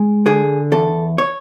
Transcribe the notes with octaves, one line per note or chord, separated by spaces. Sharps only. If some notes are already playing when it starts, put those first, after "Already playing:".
Already playing: G#3
D3 G#4
E2 A4
C#5